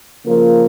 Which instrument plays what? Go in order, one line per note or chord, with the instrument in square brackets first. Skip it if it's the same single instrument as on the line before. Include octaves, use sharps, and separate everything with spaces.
[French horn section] C#3 F3 A#3 F4 A#4